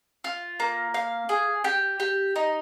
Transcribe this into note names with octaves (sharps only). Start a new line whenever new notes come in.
F4
A#3
F5
G#4
G4
G4
D#4